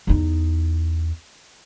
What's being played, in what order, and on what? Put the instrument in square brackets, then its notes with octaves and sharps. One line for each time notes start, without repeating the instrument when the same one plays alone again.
[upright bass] E2 D#4